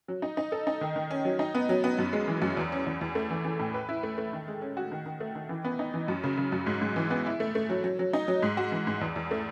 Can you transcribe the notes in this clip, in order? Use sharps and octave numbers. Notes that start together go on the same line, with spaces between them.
F#3
D#4
D#4
A4
D#4
D#3
D#3
C#4
F#3
D#4
B3
F#3
B3
F#2
G#3
E3
F#2
E2
C#4
E2
E2
A3
E3
E3
A2
B4
E4
A3
A3
D#3
G#3
C#4
F#4
D#3
D#3
A3
D#3
E3
B3
D#4
E3
F#2
C#3
C#3
F#2
G#2
G#2
E3
B3
E4
A3
A3
F#3
F#3
F#3
D#4
F#3
G#2
F#4
E3
G#2
E2
E2
A3